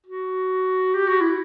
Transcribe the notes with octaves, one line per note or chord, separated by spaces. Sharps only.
F#4
G4
F#4
E4